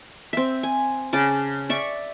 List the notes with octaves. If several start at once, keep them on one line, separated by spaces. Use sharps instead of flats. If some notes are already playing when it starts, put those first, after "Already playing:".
C4 E5
G#5
C#3 A5 D6
D5 E5 C#6